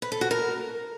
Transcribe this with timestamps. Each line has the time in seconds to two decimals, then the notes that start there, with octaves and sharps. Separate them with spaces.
0.02 B4
0.12 A4
0.21 F#4
0.31 A#4